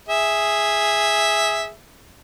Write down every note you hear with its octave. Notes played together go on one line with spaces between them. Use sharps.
G#4 E5